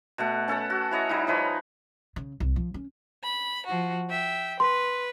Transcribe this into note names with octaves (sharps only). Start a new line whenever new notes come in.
B2 A3 F#5
C#4 A4 F#5 A5
F#4
E4 C#5 D#5 A#5
G3 D#4 E4
F3 B4 C#5 D#5
C#3
C2
F3
C#4
B5
F3 F#4
E5 G5
B4 C6